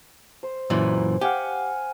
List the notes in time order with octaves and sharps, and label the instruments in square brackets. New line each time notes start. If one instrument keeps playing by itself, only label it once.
[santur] C5
[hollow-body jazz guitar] F#2 A#2 E3
[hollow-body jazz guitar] G4 [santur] F5 F#5 G#5